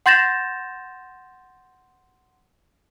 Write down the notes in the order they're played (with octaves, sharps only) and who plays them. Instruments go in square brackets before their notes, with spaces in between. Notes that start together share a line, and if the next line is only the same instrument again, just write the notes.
[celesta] F#5 C6 G6 A6 A#6 E7